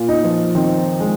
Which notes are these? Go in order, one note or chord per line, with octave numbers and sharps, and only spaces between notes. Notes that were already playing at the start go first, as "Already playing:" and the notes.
Already playing: A#2 F4
D#4
F3
D#3 C4
G#3